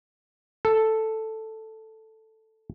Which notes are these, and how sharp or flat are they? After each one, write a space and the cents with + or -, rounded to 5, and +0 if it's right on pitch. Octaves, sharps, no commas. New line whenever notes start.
A4 +0